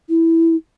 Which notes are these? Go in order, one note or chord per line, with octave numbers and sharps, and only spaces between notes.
E4